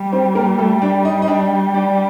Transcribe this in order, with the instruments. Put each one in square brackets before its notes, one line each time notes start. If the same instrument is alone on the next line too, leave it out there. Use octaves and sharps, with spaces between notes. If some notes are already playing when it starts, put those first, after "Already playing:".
Already playing: [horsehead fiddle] G3
[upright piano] C4 C5
A#3 A#4
A3 A4
D4 D5
D#4 D#5
D#5
D4 D5
D4 D5